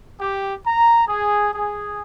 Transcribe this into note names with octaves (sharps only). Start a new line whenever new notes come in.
G4
A#5
G#4
G#4